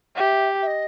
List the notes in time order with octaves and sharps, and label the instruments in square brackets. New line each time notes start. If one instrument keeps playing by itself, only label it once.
[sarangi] G4 [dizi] F#5
[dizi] E5
E5
D#5